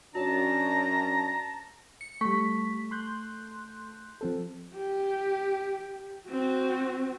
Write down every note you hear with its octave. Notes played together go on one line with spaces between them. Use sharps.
F#2 C#4 D4 F#4 C#5 A5 A#5
C#7
G3 A3 C#6 B6
C6 F#6 G6
F3 C4 A4
G4
C4 F#4